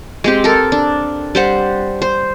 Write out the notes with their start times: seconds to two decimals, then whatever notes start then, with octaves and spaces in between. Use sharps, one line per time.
0.24 G#3 C4 G4
0.44 A4 A#4
0.72 D4
1.35 G3 C5 F#5
2.02 C5